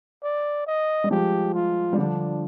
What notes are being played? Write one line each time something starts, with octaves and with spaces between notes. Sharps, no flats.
D5
D#5
G3
F3 G#3 G4
F4
G3
D3 F3 D4